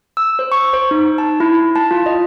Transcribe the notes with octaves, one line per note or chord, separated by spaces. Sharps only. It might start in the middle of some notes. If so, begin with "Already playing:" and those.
E6
C5
C#6
C5
D#4
A5
E4
A5
F4
D#5